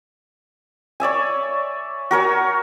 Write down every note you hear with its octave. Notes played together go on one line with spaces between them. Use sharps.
C#5 D5 E5 G#5
F#4 A#4 C#5 G#5